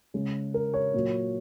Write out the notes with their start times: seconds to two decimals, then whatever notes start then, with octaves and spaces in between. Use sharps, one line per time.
0.14 C#3 G#3
0.54 A#4
0.74 C#5
0.94 A#2 F#3 A#3